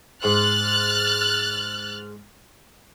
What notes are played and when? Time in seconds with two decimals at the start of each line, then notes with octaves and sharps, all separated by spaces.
0.24 G#2 F6 F#6 A6